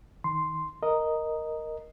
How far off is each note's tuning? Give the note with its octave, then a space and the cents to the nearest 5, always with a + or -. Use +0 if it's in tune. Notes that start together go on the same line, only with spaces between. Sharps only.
D#3 +20 C6 +0
A#4 +0 D#5 +0